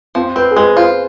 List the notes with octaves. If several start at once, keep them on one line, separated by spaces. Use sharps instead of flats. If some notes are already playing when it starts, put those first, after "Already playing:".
F3 C4
C4 B4
G#4
G#3 B4
F4 C5